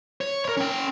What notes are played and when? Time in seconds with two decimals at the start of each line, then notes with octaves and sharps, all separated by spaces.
0.21 C#5
0.45 A#4 C#5
0.57 C#4 G5